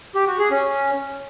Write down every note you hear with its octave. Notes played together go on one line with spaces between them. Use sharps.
G4
F#4
G#4
C#4